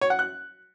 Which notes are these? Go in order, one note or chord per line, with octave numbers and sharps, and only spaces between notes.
C#5
F#5
F#6